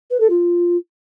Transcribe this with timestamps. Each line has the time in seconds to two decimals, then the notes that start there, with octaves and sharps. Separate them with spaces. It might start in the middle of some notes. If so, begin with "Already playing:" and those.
0.11 B4
0.20 A4
0.30 F4